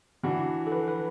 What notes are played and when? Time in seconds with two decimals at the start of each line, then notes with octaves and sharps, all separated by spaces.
0.23 E3 D4 E4 F#4
0.67 A4
0.72 B4
0.88 B4